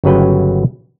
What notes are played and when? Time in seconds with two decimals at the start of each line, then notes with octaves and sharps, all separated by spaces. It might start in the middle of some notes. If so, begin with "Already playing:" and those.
0.04 G1 C#3 F#3 B4 G5